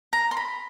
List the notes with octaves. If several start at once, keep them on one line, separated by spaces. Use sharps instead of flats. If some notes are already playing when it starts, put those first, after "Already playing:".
A#5
C6
B5